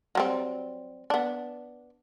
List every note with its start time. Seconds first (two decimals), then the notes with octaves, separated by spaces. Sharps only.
0.15 F#3 G3 C4
1.10 B3 D4